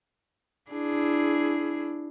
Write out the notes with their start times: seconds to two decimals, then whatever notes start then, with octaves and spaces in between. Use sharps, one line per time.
0.71 D4 E4 G#4